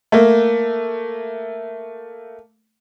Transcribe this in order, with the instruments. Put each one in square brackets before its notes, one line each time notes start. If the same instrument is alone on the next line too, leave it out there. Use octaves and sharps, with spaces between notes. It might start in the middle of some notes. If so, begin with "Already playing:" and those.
[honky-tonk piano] A3 A#3